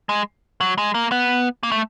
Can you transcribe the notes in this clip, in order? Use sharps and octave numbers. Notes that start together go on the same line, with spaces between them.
G#3
F#3
G#3
A#3
B3
A#3
A3